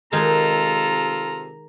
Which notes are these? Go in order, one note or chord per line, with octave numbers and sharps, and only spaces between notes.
C3 D#3 G#3 D#4 F4 A4 A#5